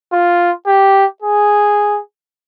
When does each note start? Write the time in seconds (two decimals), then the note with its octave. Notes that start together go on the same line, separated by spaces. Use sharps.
0.12 F4
0.67 G4
1.22 G#4